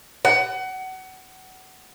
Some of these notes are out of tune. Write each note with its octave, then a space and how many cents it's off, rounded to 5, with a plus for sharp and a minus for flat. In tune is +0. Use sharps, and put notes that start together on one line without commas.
F#5 +25